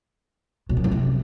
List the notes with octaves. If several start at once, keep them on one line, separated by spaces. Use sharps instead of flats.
B2
F#2
A2
C3